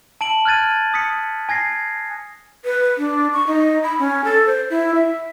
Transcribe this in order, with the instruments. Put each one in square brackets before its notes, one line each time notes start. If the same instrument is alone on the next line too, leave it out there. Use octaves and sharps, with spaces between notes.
[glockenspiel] A5 D7 F#7
F6 F#6 G#6 A6 D#7
D#6 B6 C#7
G#5 G#6 A#6 C7
[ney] B4
D4
C#6
D#4
B5
C#4
A4
C5
E4
E5